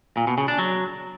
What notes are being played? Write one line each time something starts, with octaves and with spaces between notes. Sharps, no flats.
A#2
B2
C#3
D4
F#3